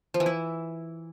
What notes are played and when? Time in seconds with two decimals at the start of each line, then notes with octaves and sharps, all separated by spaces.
0.14 F3
0.20 E3
0.26 E4